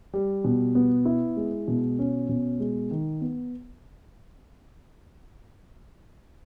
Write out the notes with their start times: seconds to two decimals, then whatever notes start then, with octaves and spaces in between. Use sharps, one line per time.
0.14 G3
0.44 B2
0.75 B3
1.05 E4
1.37 G#3
1.68 B2
1.99 C#4
2.29 B2
2.60 G#3
2.91 D#3
3.21 B3